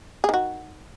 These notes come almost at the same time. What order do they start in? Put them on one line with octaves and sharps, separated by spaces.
G#4 D#3 F#4